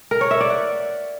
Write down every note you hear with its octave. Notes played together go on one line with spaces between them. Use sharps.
A#4
C#5
E5
D5
F#5